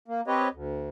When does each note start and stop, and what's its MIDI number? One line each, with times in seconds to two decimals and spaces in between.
0.08 0.21 58
0.27 0.48 60
0.27 0.48 67
0.27 0.48 71
0.27 0.48 73
0.27 0.48 75
0.53 0.89 38